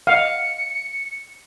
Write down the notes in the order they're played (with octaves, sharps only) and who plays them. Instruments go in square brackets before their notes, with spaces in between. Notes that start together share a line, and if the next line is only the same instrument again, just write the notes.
[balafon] D#5 F#5 [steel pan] F5 [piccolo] C#7